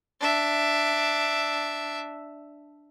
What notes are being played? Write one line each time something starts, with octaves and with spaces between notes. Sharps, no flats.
D4 E5